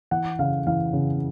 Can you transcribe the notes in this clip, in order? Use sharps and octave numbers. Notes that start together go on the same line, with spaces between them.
E3 F#5
C#3 F5
E3 F5
C#3